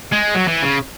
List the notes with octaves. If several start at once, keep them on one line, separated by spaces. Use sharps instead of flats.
G#3
F#3
E3
C#3